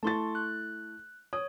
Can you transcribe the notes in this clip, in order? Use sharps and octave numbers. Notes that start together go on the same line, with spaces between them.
A3 E4 A5 C6 C#6 A6
F#6
C#5 D#6